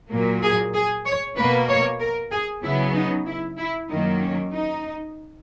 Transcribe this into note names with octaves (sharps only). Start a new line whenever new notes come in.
A#2 F#3 A#3
G#4
G#4
C#5
B2 A#3 B4
C#5
A#4
G#4
C#3 F#3 B3 E4
D#4
E4
E4
F#2 D#3 F#3 A#3 D#4
C#4
D#4